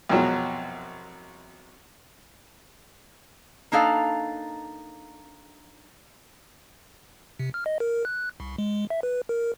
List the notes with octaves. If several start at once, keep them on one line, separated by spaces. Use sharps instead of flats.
C2 F2 B2 F#3 G#3
A#3 D4 D#4 A4 F5
C3
F6
D#5
A#4
F#6
C2
G#3
E5
B4
A#4